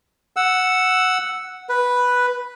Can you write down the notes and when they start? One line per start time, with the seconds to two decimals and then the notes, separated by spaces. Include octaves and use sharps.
0.36 F#5 E6
1.69 B4